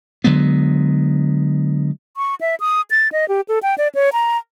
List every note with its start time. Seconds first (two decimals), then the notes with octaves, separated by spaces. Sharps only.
0.24 D3 F#3 G#3 B3
2.17 C#6
2.41 E5
2.60 D#6
2.91 A6
3.12 D#5
3.29 G4
3.49 A4
3.63 G5
3.78 D5
3.95 C#5
4.13 A#5